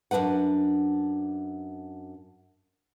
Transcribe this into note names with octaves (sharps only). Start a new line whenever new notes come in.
F#2 C#3 D4 B4 F#5